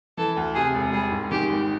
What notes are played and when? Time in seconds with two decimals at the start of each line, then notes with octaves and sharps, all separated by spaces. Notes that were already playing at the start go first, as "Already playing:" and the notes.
0.17 E3 A4
0.37 D2
0.55 C3 G#4
0.74 E1
0.93 G3 G#4
1.12 G#2
1.31 D#3 G4
1.49 G#1